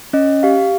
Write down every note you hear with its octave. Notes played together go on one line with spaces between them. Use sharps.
C#4 D#5
G4 F5